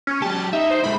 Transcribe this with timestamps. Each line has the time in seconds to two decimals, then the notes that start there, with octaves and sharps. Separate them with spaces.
0.07 C#4
0.22 F#3 G4 A5
0.53 D#4 E5
0.71 C5
0.84 G#3 E4 B5